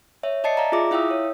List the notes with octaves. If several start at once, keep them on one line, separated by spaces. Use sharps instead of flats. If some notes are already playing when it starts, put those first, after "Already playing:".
C#5 E5
D5 D#5 A5 A6 C7 C#7
D5 E5 F5 A#5
F4 G#4 E5 D6 A#6
E4 E5 F5 G5 D#6 E6
C#5